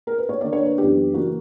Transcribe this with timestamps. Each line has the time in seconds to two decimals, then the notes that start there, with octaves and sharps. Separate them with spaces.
0.07 A#4
0.18 B4
0.29 C#5
0.41 D3 A#3 D4 D5
0.53 C#5
0.65 B4
0.78 F#2 E3 B3 D4 G4
1.14 C#3 E3 A#3 F#4